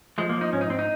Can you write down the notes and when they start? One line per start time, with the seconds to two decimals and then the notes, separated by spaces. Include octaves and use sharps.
0.18 F3 G#3
0.29 A#3
0.35 F3
0.41 D#4
0.52 G#2 C#4
0.61 D#4
0.70 G#2 C4
0.79 D#4